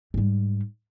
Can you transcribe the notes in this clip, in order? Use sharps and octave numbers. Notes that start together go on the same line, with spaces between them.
G#2 G3